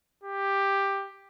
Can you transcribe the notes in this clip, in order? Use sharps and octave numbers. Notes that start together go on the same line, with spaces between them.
G4